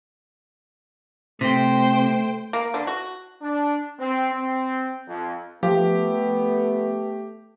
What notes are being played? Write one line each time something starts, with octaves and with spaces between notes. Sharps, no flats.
C3 A3 C5 G5
A#3
D3
F#4
D4
C4
C4
F2
F3 A3 B3 G4